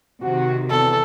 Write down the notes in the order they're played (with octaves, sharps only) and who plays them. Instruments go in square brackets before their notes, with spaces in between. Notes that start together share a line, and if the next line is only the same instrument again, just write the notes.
[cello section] C3 D#3 [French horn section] F#4
[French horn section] E2 [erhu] A4